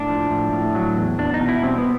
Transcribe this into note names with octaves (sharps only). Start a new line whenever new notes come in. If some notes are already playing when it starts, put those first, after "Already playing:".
Already playing: A2 D4
F3
A2
A2
F#3
E2
E2 D4
D#4
B2
E4
G3 C4
B3